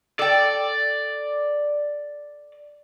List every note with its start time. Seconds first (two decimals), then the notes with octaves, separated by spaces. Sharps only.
0.19 A4 D5 G5